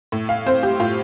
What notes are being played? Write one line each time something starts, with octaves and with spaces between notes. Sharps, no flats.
A2
F5
C4 C5
G4
A2 F4